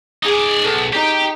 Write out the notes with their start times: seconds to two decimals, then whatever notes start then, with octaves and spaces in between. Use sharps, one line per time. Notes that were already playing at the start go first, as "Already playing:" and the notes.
0.23 D#4 G#4 D5
0.64 B1 A4
0.93 D#4 G4 G5